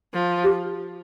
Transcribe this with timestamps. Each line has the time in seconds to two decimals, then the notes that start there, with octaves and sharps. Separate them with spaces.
0.14 F3
0.43 G4